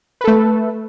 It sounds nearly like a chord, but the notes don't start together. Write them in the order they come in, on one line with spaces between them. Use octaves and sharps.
B4 A4 A3